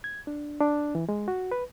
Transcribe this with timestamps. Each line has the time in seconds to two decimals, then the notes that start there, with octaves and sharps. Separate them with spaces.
0.04 G#6
0.27 D4
0.60 D4
0.95 E3
1.09 G#3
1.28 F#4
1.52 B4